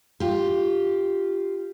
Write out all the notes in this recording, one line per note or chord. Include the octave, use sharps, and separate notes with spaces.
F4 G4